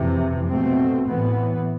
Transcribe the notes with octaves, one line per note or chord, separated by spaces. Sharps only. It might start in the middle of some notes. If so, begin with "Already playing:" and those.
Already playing: F2 C3 E3
B2 A3 C4
A2 E3 B3